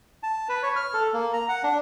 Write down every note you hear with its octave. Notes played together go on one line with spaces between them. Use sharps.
A5
B4
C#5
F6
A4
A#3
A#5
F#5
D4